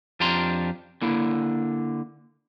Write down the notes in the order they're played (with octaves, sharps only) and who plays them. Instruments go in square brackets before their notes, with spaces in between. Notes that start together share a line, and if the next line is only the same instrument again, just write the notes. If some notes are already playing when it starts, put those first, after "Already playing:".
[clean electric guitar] F2 D4 F4 G4 A#5 C6
D3 A#3 E4